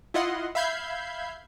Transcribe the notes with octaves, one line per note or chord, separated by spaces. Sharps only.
E4 F4 D#5 F#5 C6
E5 F5 B5 G6 G#6 C7